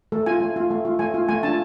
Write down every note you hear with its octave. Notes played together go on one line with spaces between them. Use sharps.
A3 A4
F4 G#5
A3
F4
A3
F4
A3 G#5
F4
A3 G#5
D4 F4 A5